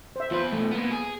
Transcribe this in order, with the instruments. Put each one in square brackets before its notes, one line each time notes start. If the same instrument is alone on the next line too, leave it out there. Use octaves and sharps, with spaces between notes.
[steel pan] C5 E5
[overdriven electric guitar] E2 B4 [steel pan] F4 C5
[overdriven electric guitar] B2 A3
A#3 B3
G#4